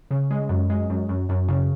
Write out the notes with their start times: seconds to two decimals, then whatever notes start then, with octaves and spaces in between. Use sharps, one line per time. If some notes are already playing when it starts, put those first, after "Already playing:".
0.11 C#3
0.31 G#3
0.49 F#2
0.70 G#3
0.90 F#2
1.09 F#2
1.29 F#2
1.48 C#3